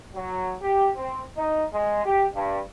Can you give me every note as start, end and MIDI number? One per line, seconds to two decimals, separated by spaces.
0.15 0.55 54
0.62 0.89 67
0.96 1.21 60
1.36 1.64 63
1.73 2.03 56
2.05 2.25 67
2.34 2.59 43